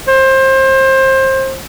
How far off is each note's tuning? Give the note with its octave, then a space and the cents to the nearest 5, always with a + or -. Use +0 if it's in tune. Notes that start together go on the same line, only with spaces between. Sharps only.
C5 +25